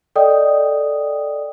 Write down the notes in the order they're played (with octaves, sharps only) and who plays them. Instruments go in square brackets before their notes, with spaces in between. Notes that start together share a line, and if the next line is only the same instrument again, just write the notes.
[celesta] A4 D5 D#5 G5 D#6